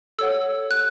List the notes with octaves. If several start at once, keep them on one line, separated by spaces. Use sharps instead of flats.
A4 C#5 F#5 E6
F#6